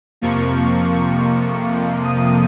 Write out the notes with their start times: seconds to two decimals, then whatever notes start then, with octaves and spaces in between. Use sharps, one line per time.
0.21 F2 C3 F3 A#3 C#6
0.94 C#6
2.03 D#6